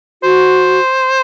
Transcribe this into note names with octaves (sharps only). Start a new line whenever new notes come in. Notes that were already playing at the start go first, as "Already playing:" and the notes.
F#4 C5